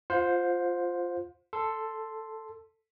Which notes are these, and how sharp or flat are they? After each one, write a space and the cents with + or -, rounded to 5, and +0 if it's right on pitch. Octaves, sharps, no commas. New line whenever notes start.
F4 +0 C5 +0 F5 +45
A4 +5 C6 +0